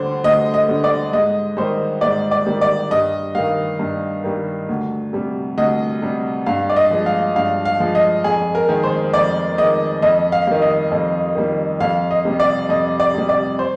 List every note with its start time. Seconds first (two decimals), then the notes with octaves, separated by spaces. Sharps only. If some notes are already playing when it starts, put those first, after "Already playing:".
Already playing: D2 D3 G3 C5
0.24 D2 D#5
0.54 D#5
0.69 D3 G3
0.84 D5
1.13 G#2 D#5
1.57 D#3 G3 C5
2.01 G#2 D5
2.31 D5
2.46 D#3 G3
2.61 D5
2.91 G2 D#5
3.35 D#3 G3 F5
3.79 G2
4.24 D#3 G3
4.69 D2
5.13 C3 G3
5.58 D2 D#5
6.02 C3 G3
6.46 G2 F5
6.70 D5
6.76 D#5
6.91 F3 G#3
7.06 F5
7.36 G2 F5
7.65 F5
7.80 F3 G#3
7.95 D#5
8.24 F2 G#4
8.55 A#4
8.69 D#3 G#3
8.83 C5
9.14 F2 D5
9.58 D#3 G#3 D#5
10.02 F2 D#5
10.32 F5
10.47 D#3 G3
10.62 D#5
10.91 F2
11.35 D#3 G3
11.80 F2 F5
12.11 D#5
12.25 C3 G3
12.40 D5
12.69 F2 D#5
13.00 D5
13.14 C3 G3
13.29 D5
13.59 C5